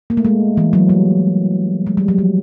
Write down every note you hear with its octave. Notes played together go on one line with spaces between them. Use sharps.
A#3
A3
G#3
E3
F#3
G3
G#3
G3
F#3
F3